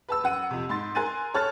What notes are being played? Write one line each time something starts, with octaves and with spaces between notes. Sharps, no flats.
B4 A5 E6
F#2 F#5 D#7
F2 C3
G#2 C6 A6
A#4 G#5 C6 F#6 A6 D#7
A4 C#5 A5 F6 F#6 A6